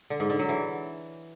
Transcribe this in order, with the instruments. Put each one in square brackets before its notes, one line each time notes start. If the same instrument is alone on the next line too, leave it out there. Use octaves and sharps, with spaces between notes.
[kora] D3
G#2
D3
F#3
E3